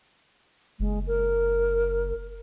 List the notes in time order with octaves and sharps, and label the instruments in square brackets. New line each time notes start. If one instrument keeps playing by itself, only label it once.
[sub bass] F#1 [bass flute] G#3
[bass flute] A#4